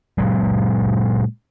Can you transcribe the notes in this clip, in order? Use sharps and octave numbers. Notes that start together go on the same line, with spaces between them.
A#2 F#3 G#3